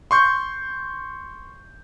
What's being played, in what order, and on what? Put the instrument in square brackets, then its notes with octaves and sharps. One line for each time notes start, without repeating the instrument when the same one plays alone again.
[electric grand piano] C6 C#6 G6